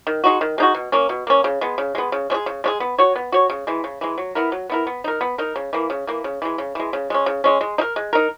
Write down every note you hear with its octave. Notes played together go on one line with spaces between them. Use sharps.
D#3
G#3 D#4 F#4
D#3
G#3 D#4 F#4
B2
A#3 C#4
B2
A#3 C#4
C#3
G#3 B3
C#3
G#3 B3
C#3
G#3 C#4 G#4
C#3
G#3 C#4 G#4
B3
F#4 C#5
B3
F#4 C#5
C#3
E3 G#3
C#3
E3 G#3
F#3
B3 E4 A#4
F#3
B3 E4 A#4
B3
D#4 A#4
B3
D#4 A#4
C#3
E3 A#3
C#3
E3 A#3
C#3
E3 G#3
C#3
E3 G#3
C#3
G#3 C#4
C#3
G#3 C#4
G#3
D#4
A#4
G#3
D#4 A#4